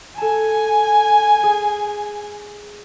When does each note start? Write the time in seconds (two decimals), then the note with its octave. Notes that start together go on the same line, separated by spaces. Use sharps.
0.18 A4 G#5 A5
1.43 G#4